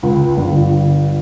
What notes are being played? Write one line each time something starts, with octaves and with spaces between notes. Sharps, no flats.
C#2
G1